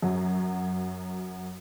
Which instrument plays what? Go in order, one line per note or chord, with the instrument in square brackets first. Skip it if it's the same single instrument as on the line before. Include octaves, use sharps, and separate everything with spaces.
[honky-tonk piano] F#2 F#3